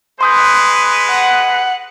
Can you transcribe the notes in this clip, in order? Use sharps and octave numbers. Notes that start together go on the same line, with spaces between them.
G#3 B4 C6 D#6 G6
F#5